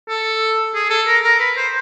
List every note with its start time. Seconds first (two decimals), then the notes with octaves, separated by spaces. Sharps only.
0.09 A4
0.75 G#4
0.90 A4
1.07 A#4
1.24 A#4
1.40 B4
1.57 C5